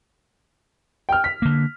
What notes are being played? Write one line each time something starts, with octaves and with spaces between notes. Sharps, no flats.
G5 F6
B6
D3 A#3